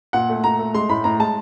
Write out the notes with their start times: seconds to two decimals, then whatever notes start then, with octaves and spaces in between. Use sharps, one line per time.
0.13 A#2 F#5
0.30 A3
0.43 A#2 A#5
0.59 A3
0.74 G#3 C6
0.89 A2 B5
1.04 A2 A#5
1.20 G#3 A5